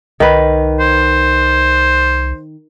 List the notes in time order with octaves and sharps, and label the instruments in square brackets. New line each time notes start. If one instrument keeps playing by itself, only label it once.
[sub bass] C2 [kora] D#3 B4
[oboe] C5